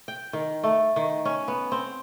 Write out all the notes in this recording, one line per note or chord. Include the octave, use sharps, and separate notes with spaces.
G5
D#3
A3
D#3
C#4
B3
C4